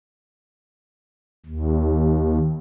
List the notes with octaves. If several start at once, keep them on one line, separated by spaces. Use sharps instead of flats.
D#2